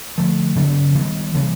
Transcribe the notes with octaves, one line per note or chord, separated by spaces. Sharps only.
D3 F3 A3
C#3 F#3 B3 D4
D#3 G3 B3
C3 E3 G3 A#3